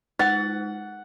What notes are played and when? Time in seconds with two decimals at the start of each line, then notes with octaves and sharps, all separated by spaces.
0.19 G#3 D#4 F#5 A6